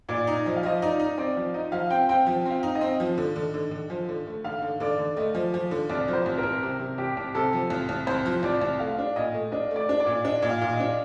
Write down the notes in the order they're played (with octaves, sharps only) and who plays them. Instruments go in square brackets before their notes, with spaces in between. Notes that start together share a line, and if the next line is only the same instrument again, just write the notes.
[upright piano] A#2 [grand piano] D5
[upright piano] D#4
[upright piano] F3 [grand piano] D#5
[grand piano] F5
[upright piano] F3 [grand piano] D#5
[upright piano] D#4 [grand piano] D5
[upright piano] D#4
[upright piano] C4 [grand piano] D5
[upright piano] F3
[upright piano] D#4 [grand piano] D#5
[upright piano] F3 [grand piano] F5
[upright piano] C4 [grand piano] G5
[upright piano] C4 [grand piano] G5
[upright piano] F3
[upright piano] C4 [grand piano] F5
[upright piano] D#4
[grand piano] D#5
[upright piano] C4
F3
D3
D3
D3
D3
F3
D3
A3
[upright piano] D3 [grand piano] F5
[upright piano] D3
[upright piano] D3 [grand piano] D5
[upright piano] D3
[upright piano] A3 [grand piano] D#5
[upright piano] F3
F3
D3
[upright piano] C2 [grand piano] D5
[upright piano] F3
[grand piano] C5
[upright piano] C2
[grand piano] A#4
[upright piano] C2
C3
C3
[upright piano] C2 [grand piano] G4
[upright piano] C2
[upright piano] C3 [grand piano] A4
[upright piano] F3
C2
C2
[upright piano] C2 [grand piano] C5
[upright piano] F3
[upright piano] C2 [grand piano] D5
[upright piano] C2
[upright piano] A3 [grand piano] F5
[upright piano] D4
[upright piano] A#2 [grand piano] D#5
[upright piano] A3
[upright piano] D4 [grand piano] D#5
[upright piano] A3 [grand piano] D5
[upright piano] D4
[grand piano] D5
[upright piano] A#2
[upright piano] D4 [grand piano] D#5
[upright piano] A#2
[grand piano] F5
[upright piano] A#2
[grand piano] D#5
[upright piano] D4